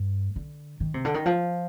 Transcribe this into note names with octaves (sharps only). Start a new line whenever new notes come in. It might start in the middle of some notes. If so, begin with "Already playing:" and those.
Already playing: G2
D3
D#3
C3
D3
D#3
F3